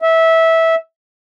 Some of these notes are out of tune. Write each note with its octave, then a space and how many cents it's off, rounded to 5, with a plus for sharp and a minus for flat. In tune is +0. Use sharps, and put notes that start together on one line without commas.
E5 -15